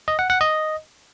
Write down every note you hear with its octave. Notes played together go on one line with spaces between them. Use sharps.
D#5
F#5
F#5
D#5